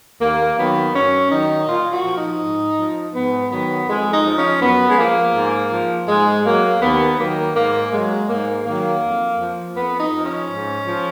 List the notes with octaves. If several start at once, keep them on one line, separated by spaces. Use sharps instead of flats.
D#2 A#3
D#3 F#3 B3
F#2 C#4
D#3 F#3 D#4
A#2 F4
F#4
F3
D#4
G#2
F3
G#2 B3
D#3 F#3 B3
F2 G#3
D#4
F3
C#4
F#2 B3
G#3
F3 A#3
G#2
F3
G#2 G#3
F#3 A#3
D#2 B3
D#3 F#3 A#3
G#2 A#3
F#3 G#3
G#2 A#3
D#3 F#3 A#3
F2
F3
F2 B3
D#4
F3
C#4
G#2
F3